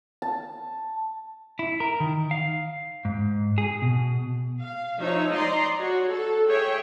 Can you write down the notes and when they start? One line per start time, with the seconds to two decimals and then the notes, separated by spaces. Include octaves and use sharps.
0.22 A5
1.59 E4
1.80 A#4
2.00 D#3
2.31 F5
3.05 G#2
3.58 G#4
3.82 B2
4.61 F5
4.99 F3 D#4 C#5 E5
5.32 D5 D#5 A#5 C6
5.77 F#4 C#5
6.11 A4
6.49 G#4 C#5 E5 G5